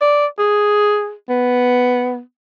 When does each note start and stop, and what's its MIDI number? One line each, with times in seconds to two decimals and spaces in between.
0.01 0.26 74
0.39 1.13 68
1.29 2.20 59